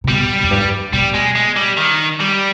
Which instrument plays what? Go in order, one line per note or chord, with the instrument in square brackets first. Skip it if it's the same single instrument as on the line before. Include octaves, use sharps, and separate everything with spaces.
[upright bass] C3
[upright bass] B2 [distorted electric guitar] G3
[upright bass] F2
G2
[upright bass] B2 [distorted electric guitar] G3
[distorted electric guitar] G#3
G#3
G3
D#3
G3